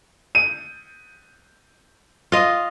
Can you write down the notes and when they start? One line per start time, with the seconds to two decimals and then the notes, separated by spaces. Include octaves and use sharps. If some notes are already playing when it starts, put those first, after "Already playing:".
0.35 D#7
2.32 F4 D#5